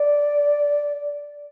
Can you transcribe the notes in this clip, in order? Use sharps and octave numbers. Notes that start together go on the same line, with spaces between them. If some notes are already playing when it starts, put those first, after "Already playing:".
Already playing: D5